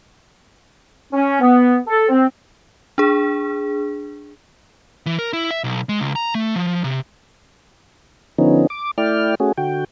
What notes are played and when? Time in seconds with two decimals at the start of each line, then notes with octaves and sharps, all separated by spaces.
1.12 C#4
1.41 B3
1.87 A4
2.09 C4
2.98 D4 G#4
5.06 E3
5.19 A#4
5.33 E4
5.51 E5
5.64 B1
5.89 G#3
6.00 C#2
6.16 A#5
6.35 A3
6.56 F3
6.84 C3
8.38 D3 F3 B3 C#4 D#4
8.70 D6
8.98 A3 E4 D5 G5 F6
9.40 A3 C#4 F#4 G#4
9.57 D3 F#4 G5